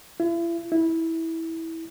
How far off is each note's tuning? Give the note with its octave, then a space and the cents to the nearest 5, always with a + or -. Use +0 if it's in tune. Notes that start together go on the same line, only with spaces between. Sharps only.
E4 +40
E4 -15